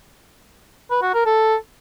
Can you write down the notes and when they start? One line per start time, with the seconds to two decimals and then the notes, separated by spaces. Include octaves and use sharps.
0.91 B4
1.02 F#4
1.14 A#4
1.26 A4